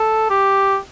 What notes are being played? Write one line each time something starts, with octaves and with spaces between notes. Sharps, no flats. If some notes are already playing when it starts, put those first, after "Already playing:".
Already playing: A4
G4